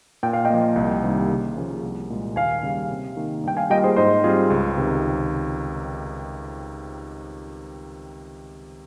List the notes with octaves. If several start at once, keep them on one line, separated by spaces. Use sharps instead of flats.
A#2 G5
F5
D#5 G5
F3 A#3
C2
C3 D#3 G3 A#3
C#3
F3 A#3 C#4 G#4
C2
A#2 G#3
D#2 F5 G#5
C#3 G3
C3
D#3 A#3
G2 G5
F5 G#5
G3 A#3 F4 D#5 G5
G#4 C5
G#2 C5 D#5
G3 C4 F4 G#4
C#2
C3 D#3